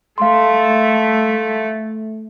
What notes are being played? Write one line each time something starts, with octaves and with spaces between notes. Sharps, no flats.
A3 F5 C6